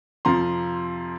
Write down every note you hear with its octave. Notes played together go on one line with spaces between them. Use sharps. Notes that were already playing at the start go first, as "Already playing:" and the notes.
F2 C3 F3 A#5 C6